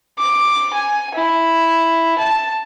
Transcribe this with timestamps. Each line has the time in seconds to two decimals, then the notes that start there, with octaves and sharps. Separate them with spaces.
0.19 D6
0.73 G#5
1.15 E4
2.18 A5